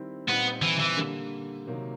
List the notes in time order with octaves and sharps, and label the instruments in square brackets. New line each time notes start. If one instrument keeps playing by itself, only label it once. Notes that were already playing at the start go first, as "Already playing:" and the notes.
Already playing: [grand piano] D#3 G3 C4 E4
[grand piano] A#2 G3 C4 D#4 [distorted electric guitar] B3
[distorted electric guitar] E3
E3
[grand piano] D3 G3 A#3
C3 D#3 F#3 A#3